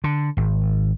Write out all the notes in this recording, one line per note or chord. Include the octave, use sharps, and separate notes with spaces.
D3
G#1